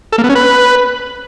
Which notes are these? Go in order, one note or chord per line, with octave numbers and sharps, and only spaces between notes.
A4
A#3
B3
C#4
B4